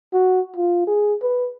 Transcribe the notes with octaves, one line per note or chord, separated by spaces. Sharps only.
F#4
F4
G#4
B4